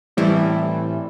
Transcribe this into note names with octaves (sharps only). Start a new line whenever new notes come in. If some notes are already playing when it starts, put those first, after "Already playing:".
A2 E3 G3 C4 E4